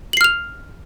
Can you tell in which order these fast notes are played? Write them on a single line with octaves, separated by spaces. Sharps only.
F#7 C7 F6 F7